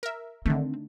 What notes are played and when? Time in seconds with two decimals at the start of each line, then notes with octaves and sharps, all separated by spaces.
0.03 A#4 E5
0.46 D3 D#3 A3 C4